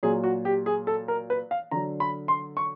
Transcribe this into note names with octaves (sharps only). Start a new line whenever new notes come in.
A#2 F#3 G#4
F#4
G4
G#4
A4
A#4
B4
F5
D3 F#3 A#5
B5
C6
C#6